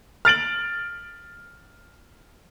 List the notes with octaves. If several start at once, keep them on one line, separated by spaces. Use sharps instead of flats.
F6 A6 D7 F#7